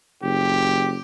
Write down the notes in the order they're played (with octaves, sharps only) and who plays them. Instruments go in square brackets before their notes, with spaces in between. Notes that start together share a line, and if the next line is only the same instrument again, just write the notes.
[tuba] F#1 [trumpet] G4